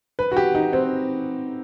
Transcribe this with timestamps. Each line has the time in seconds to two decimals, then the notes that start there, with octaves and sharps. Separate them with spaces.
0.19 B4
0.32 F#4
0.37 G4
0.55 D#4
0.73 C4